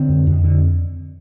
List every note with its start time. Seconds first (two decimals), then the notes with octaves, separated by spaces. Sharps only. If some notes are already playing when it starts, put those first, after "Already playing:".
Already playing: D3 C4
0.09 F2
0.27 F2
0.44 D3